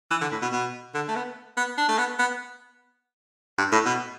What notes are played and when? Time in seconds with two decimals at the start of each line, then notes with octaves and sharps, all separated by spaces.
0.11 E3
0.21 D3
0.31 A2
0.42 B2
0.52 B2
0.94 D3
1.08 A3
1.15 B3
1.57 B3
1.78 D4
1.88 A3
1.98 B3
2.19 B3
3.58 G2
3.72 A2
3.86 B2